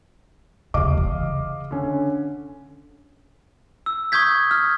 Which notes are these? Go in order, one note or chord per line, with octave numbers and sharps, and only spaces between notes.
D#2 C#3 D#5 F5 D6
C#3 E3
D3 C#4
E6
C#6 D#6 G6 G#6 B6
F6